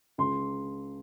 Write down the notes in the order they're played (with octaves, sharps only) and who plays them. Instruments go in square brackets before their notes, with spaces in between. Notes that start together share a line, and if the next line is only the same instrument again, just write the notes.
[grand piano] C#2 C6